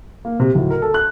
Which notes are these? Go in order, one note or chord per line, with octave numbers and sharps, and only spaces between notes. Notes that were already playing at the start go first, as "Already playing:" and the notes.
A#3
C3
D1
A#4
A4
F#6